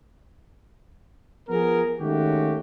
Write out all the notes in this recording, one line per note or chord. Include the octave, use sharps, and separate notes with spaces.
F3 B3 G#4 A#4
D#3 G#3 A3 C#4 F#4 G4